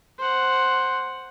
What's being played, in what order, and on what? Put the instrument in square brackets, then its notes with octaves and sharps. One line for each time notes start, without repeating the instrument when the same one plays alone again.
[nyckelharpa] C5 F#5